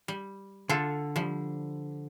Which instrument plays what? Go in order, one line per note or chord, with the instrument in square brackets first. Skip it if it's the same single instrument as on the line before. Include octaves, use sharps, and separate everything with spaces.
[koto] G3
[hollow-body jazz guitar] D3 [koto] F4 A4
[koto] F3 G3